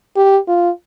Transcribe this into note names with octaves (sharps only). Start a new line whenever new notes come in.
G4
F4